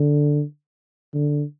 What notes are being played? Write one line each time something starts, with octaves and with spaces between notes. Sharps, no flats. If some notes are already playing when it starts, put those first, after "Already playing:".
Already playing: D3
D3